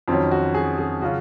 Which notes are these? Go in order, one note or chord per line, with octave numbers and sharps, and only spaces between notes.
F2 D#3 F#3 C4 C#4
F#4
G#4
G#4
C#3 F#3 C#4 F4 F#4